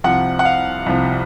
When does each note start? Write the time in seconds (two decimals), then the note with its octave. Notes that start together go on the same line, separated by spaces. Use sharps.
0.04 C2 C3 F3 F#5
0.39 F#5
0.45 F5
0.86 C2 C3 F3